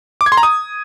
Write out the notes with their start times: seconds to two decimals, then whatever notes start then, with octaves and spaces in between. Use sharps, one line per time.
0.21 D6
0.26 G#6
0.32 C6
0.37 A#5
0.43 D#6